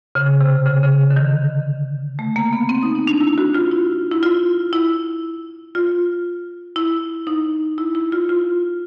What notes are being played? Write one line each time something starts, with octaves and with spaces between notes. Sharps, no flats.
C#3
C3
C#3
C#3
D3
D#3
A3
A#3
B3
C4
D#4
D#4
D4
E4
F#4
F4
E4
E4
F4
E4
F4
E4
D#4
E4
E4
F4
F4